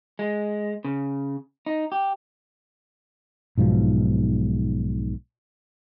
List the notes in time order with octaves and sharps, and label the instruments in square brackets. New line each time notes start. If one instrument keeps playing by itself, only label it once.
[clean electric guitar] G#3
C#3
D#4
G4
[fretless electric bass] B1 G#2 B2 F3